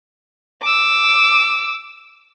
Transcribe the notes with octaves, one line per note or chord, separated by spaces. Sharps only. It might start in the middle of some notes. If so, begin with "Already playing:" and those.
D6 E6